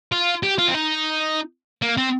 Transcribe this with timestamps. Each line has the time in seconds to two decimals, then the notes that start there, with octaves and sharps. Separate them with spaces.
0.12 F4
0.43 G4
0.58 F4
0.68 C4
0.74 D#4
1.82 A#3
1.97 C4